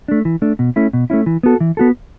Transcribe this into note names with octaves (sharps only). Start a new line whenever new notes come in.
A3 D4
E3
A3 D4
B2
A3 C#4 E4
B2
A3 C#4 E4
E3
B3 F#4 A4
E3
B3 F#4 A4